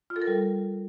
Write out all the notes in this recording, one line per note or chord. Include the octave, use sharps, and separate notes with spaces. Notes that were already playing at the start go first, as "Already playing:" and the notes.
F4
A4
A#4
G3